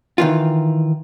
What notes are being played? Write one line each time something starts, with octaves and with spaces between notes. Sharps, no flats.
D#3 E3 F4